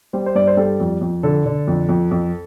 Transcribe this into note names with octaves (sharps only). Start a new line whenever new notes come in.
G3 C5
C5
G2 D5
C5
G3 A4
F2
F2
D3 A4
D3
F2
F2
F2